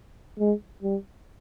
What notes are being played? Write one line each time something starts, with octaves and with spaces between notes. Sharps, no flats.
G#3
G3